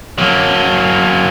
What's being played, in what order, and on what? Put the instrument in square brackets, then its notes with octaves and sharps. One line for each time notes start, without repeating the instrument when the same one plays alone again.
[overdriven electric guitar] F#3 A#3